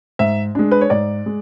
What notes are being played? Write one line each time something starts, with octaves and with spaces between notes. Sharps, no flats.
G#2 E5
G#3 D4
B4
C#5
G#2 D5
G#3